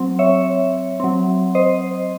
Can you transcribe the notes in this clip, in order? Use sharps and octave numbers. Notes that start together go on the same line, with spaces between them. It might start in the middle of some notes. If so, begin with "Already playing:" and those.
Already playing: F#3 C4
C#5 E5
F#3 C4
C5 D#5